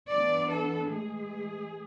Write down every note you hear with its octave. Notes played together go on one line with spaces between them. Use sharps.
E3 B3 D4 D5
A4
A2 E3 G#3 G#4